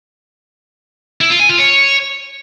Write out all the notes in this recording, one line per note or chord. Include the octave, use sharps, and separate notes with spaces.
E4
F4
G#5
F4
C#5